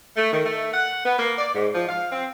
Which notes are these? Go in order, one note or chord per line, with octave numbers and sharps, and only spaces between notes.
A3
D#3
A3
F#5
B3
A#3
D5
G#2
F3
F5
C4